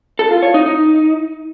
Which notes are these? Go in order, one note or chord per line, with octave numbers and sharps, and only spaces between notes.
A4
F4
C#5
D#4
D#4